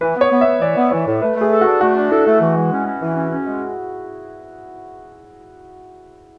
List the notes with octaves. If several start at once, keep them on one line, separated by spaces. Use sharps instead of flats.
E3 B4
B3
C#5
B3
B3 E5
E3 D5
B3
E3 C#5
A2
A3 B4
A3 G#4
A4
F#4
D4
A3 F#4
D4
E4 A4
A3
E3
G#3
C#4
C#4
E3
C#4
C#4
G#3